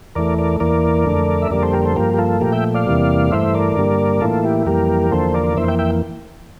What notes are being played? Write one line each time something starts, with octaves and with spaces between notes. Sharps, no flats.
E2 E3 A3 A#4 D5
A#4 D5
E2 E3 A#3 A#4 D5
F2 D3 A3
E5
F2 D3 G3 A#3 A#4 D5
A4 C5
G4 A#4
A4 C5
G2 F3 A#3 G4 A#4
G4
F4 A4
A#2 F3 A3 G4 A#4
E5 G5
D5 F5
E2 C3 E3 G3 A#3
G2 E3 A3 C5 E5
A#4 D5
G2 D3 G3 A#3
A2 E3 A#3 F4 A4
E4 G4
F2 E3 G3 A#3 G4 A#4
E2 D3 F3 A#3 A4 C5
A#4 D5
F2 E3 A#3 C5 E5
E5 G5
E5 G5